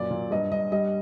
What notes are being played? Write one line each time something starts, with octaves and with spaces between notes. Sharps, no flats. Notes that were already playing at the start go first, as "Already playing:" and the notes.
Already playing: F#2 A#2 D5
A#2
G2 D#5
G2 D#5
G3 D#5